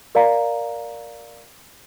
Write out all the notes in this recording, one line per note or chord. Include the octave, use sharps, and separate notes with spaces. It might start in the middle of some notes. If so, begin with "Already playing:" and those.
A#4 D5 F5 A#5